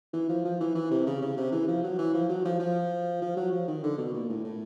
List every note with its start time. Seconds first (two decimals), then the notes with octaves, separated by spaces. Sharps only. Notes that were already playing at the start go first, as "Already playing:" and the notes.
0.13 E3
0.29 F3
0.44 F3
0.60 E3
0.75 E3
0.91 C3
1.06 C#3
1.22 C#3
1.37 C3
1.52 E3
1.68 F3
1.83 F#3
1.98 E3
2.14 F3
2.29 F#3
2.45 F3
2.59 F3
3.22 F3
3.37 F#3
3.52 F3
3.68 D#3
3.83 D3
3.98 B2
4.14 A#2
4.29 A2
4.44 A2